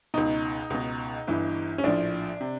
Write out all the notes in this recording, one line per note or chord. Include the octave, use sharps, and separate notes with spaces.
C#2 B2 D#4
C#2 B2
G1 G2 E3
C#4
A#1 A2 F3 D4
C3